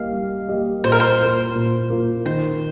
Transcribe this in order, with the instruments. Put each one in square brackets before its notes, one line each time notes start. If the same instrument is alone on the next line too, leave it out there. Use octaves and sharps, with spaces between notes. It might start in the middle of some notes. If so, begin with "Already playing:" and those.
Already playing: [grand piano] G3 A#3 G4 A#4 D#5 [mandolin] F5
[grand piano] G3
A#3 G4 A#4 D#5
[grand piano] A#2 [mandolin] C5
[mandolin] A#4
C5
[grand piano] A#3 F4
A#2
A#3 F4
[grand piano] D#3 [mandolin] C5